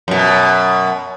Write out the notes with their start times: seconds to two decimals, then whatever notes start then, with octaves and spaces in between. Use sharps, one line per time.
0.08 F#2 B2